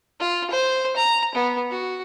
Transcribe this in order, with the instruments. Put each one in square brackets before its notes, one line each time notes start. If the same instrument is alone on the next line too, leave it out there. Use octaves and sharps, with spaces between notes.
[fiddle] F4
C5
A#5
B3
F#4